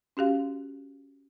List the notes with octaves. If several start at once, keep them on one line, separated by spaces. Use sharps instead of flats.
C#4 F#4 G4 F5